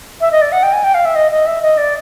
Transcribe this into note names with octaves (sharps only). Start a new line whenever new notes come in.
E5
D#5
D5
F#5
G5
G#5
G5
F5
E5
D#5
D#5
E5
D#5
D5